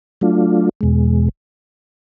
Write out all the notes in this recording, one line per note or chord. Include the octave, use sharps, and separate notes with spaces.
F#3 A3 D4 F4
E2 B2 G#3